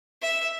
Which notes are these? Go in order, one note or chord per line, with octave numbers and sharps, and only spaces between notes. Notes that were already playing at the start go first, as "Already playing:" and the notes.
E5